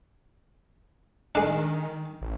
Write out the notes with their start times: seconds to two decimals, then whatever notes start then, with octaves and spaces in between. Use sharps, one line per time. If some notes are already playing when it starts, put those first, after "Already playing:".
1.35 D#3 G#3 D4
2.21 A1